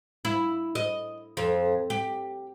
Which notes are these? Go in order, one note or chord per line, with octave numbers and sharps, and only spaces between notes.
E4
D#5
F2
G4